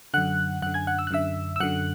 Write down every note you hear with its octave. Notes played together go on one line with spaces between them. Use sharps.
F#2 D3 F#5 F#6
F#2 D3 F#5 F#6
G#5 G#6
F#5 F#6
E6
F#6
F#2 D3 E5 E6
E6
F#2 D3 F#5 F#6